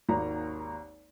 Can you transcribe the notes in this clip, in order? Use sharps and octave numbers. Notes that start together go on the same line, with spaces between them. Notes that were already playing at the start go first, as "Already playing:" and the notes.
G#1 D#2 A#3 A#5